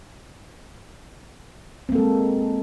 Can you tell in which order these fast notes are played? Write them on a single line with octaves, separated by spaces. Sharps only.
C4 A#3 A4 G#3